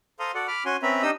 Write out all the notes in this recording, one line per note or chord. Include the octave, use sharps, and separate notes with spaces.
A4 C5 F5 A#5 C6 D#6
F#4 A4 D5 F#5
B5 D6 F6
C#4 F#4 G#5 C6
C4 C#4 B4 E5 A#5 B5
D4 D#4 G4 D#5 D#6 E6